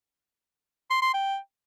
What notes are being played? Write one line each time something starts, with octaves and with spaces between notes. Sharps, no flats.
C6
C6
G5